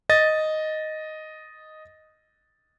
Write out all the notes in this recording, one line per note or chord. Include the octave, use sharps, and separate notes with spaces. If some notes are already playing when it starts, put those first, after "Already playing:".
D#5 A6